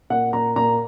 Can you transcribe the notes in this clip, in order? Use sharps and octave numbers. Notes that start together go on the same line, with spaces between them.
A#2 F#5
A#2 A#5
A#2 A#5